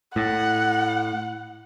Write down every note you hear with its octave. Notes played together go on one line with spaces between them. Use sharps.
A2 F#5